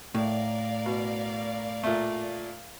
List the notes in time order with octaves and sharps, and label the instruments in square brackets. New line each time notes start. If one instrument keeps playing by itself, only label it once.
[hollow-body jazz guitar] A2 [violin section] A#4 D5 F5
[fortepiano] B2
A#2 A3